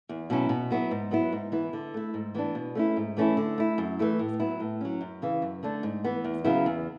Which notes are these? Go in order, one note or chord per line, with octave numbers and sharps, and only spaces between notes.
E2
B2 F#3 C#4 E4
B2
F#3 B3 E4
G#2
F#3 B3 E4
G#2
E3 B3 E4
D3
A3 E4
G#2
E3 B3 D4
B2
A3 C#4 E4
G#2
E3 A3 C#4 E4
D3
A3 E4
F#2
E3 A3 E4
A2
F#3 B3 E4
A2
F#3 C#4
F#2
C#3 E3
F#2
D3 A3 D4
G#2
E3 B3
E2
C#3 F#3 B3 E4
E2